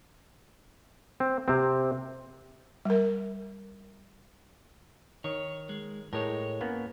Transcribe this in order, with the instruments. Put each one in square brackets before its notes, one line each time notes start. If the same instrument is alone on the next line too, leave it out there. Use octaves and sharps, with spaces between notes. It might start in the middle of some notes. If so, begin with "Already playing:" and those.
[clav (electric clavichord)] C4
C3 C4
[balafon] G3 A#4
[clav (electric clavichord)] D#3 [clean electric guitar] C#5
[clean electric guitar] G#3
[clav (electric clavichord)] A2 G#3 [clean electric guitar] A#4 C#5
[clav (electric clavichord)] A#3 B3 C#4